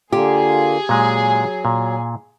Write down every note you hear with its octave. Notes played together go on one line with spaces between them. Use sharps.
D3 A#3 F4 G4 G#4
A#2 F#3 G#3
A#2